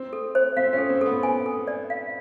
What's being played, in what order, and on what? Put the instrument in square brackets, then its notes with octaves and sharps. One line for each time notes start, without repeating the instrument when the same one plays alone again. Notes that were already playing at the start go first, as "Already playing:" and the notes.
Already playing: [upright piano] C4
[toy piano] A4
C5
[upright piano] C4 [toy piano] F5
[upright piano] C#4
[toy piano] A4
[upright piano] C4
[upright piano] B3 [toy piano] A4
[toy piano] G#5
A4
D5
F5